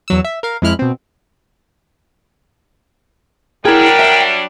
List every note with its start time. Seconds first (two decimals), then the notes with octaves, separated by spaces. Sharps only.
0.08 E2 F#3 E6
0.24 E5
0.43 A#4 F5
0.62 F2 G#3 E4 F6 F#6
0.79 B2 C4
3.65 F#3 G3 D4 E4 G#4 A#4 G5
3.99 E5